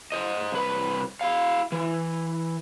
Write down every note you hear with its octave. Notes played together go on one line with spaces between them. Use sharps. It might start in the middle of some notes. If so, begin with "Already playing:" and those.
C5 D#5
C2 B4
E4 F5
E3